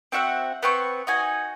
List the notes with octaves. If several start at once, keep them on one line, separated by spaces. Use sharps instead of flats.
C4 F#4 E5 F#5
B3 C4 C#6
D#4 F#4 G#5